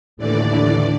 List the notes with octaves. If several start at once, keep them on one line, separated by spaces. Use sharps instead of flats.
D#2 A2 D3 E3 D5